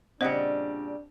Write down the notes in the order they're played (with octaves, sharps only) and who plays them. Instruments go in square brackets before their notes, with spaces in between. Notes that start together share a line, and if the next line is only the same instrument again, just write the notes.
[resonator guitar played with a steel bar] A#2 C#3 G3 [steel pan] C4 D#5 F#5 [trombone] D4 [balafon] C5